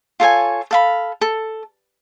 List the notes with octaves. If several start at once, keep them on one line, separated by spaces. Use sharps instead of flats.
F4 A4 C#5 G#5
A4 F5 B5
A4